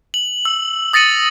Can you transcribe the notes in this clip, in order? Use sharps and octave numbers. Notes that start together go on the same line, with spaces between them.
F#7
E6
D#6 A6 A#6 C#7 D#7 F#7